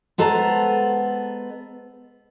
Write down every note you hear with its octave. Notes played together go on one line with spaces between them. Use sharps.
G#3 B3 A4 C5 A5 A#5